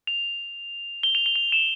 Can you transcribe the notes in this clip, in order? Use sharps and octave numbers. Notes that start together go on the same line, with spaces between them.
F7
G7
F7
G7
F7
E7